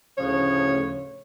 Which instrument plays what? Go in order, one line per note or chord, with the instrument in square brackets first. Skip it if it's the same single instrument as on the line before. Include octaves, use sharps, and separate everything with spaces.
[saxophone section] D2 A2 C#3 F3 C#5